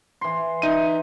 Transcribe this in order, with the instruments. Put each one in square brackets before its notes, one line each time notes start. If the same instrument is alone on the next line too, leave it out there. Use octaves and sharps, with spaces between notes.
[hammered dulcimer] E3 C6
[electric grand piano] D#4 D#7 [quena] E5